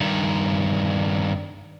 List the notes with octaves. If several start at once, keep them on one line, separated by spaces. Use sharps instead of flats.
G2 D#3